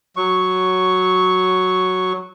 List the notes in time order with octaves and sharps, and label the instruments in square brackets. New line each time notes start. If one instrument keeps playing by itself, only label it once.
[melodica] F#3 C#6